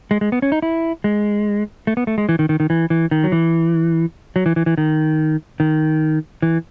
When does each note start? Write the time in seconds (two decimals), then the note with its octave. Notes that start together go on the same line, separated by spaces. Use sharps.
0.11 G#3
0.21 G#3
0.32 B3
0.42 C#4
0.52 D#4
0.62 E4
1.04 G#3
1.87 A3
1.97 B3
2.07 A3
2.18 G#3
2.29 E3
2.39 D#3
2.49 D#3
2.60 D#3
2.70 E3
2.90 E3
3.11 D#3
3.24 F#3
3.32 E3
4.36 F#3
4.46 E3
4.56 E3
4.66 E3
4.78 D#3
5.60 D#3
6.42 E3